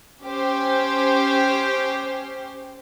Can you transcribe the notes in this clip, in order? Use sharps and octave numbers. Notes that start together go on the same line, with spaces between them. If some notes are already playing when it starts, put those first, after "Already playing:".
C#4 G4 C5